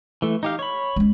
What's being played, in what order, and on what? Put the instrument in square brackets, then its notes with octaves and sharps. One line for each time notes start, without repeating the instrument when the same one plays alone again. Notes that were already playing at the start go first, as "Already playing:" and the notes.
[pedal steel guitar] E3 A3
D#4 G4 F5
C#5 B5
[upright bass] G#3 C#4